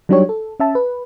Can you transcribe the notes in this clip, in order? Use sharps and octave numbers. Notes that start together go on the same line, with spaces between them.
F#3 G3 D4 D#4 G4 C#5
A4
C#4 E5 A5
B4